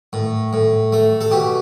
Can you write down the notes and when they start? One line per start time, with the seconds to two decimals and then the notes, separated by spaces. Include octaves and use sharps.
0.13 A2
0.53 A2
0.92 A3
1.21 A4
1.31 B2 G4